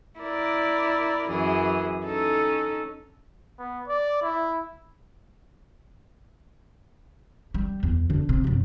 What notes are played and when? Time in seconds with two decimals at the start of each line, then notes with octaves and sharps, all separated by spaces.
0.20 E4 A#4 D5
1.29 F#2 E3 G#4
2.05 C#4 D#4 A4
3.59 B3
3.88 D5
4.22 E4
7.54 G3
7.83 E2
8.10 D3
8.29 C3
8.44 E1 F#2